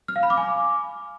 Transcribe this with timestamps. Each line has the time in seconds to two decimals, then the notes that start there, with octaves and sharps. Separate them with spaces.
0.08 F6
0.16 F5
0.23 B5
0.30 D6
0.37 G#5